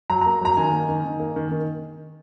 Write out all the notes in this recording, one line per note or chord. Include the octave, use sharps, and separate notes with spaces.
F#3 A#5
A#5
A#3
F#3 A#5
D#3 G#5
A#3
D#3
D#3
A#3
D#3
D#3